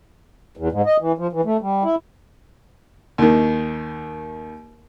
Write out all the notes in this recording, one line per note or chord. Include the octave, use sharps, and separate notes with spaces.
E2
G#2
D#5
E3
F3
E3
A3
G3
E4
D#2 D#3